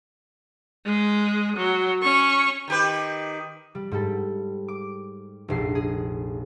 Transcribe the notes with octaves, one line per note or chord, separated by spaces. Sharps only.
G#3
F#3
C#4 C#6
D#3 G4 B4
G3
G#2 G3 A4
D6
F1 A#1 C7
G#4